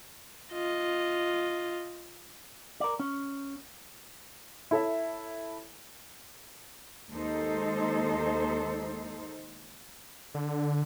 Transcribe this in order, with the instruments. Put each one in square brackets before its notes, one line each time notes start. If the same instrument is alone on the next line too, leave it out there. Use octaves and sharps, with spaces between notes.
[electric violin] F4 D#5
[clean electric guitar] A#4 D5
C#4
[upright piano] E4 A4 C#5 E5
[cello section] D#2 G#3 D#4 A4 C5
[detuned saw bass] D3